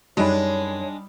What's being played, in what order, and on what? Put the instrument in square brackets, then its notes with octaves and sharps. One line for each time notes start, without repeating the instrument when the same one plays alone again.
[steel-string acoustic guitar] F#2 [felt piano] G3 D#4 B5 [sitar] G#3 D4 [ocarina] C#5